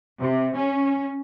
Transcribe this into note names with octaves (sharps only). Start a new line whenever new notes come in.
C3
C#4